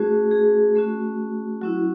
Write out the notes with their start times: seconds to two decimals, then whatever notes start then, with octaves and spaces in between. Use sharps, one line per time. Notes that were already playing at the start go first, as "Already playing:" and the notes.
Already playing: A3 C#4 F#4 G#4
0.31 G#4
0.75 A3 C#4 F#4
1.61 F#3 C#4 E4 F#4